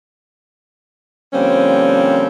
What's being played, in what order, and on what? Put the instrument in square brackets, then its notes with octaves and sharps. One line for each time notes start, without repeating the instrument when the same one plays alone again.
[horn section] D3 F3 G3 A#3 C4 C#4